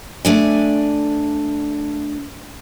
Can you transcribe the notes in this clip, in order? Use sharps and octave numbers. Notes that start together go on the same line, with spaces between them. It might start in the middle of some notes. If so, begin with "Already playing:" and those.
A3 D4 G#5